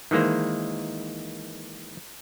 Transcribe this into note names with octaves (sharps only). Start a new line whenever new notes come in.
D#3 E3 G#3 A#3 C5